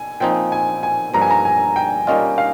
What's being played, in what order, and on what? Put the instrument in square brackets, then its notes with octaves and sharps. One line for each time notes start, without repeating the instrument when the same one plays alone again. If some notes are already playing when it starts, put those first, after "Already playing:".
Already playing: [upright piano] G#5
[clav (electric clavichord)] A#2 F3 C4 D#4 [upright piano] G5
[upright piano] G#5
G#5
[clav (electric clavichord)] G2 F3 A#3 [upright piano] A#5
[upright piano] G#5
A#5
G#5
G5
[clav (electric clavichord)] A#2 G3 A#3 C#4 F4 [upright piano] D#5
[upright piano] F5